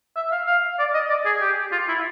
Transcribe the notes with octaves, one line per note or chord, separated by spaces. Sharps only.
E5
F5
F5
D5
D#5
D5
G#4
G4
F4
E4